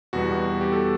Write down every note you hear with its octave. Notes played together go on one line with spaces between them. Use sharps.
E2 B2 G3 B3 F#4
G4
A4